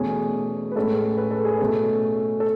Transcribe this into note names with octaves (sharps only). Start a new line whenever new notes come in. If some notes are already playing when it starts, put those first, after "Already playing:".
Already playing: E2 B2 A3 C#4 G#4
B4
A2 G#3 C#4 A4
B4
A4
G#4
B2 A3 C#4 A4
A4